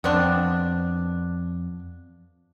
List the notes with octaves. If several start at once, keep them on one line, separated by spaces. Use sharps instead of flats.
F2 B3 C4 D4